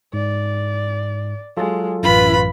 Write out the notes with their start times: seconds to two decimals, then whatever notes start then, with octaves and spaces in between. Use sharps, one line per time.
0.13 G#2 D5
1.57 F#3 G#3 F4 A4
2.03 A1 F#2 F4 B4 B5